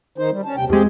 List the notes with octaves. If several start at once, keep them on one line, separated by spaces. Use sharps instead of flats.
D#3 D#4 C5
G3
C#4 A5
D#2 C3 G5
E2 G#3 C4 G4 G#4